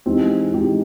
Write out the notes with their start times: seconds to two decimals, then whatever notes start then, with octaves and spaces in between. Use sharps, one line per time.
0.06 E3 G#3 C4 D#4 G4
0.54 E3 G#3 C4 D#4 G4